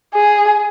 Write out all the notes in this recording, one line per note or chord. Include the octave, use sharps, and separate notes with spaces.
G#4